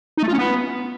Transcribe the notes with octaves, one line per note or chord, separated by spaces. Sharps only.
D#4
A3
F4
C#4
B3